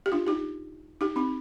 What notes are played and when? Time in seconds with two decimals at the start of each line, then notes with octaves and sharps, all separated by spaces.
0.06 G4
0.12 D4 F4
0.27 D#4 G4
1.01 D#4 G4
1.16 C4 D#4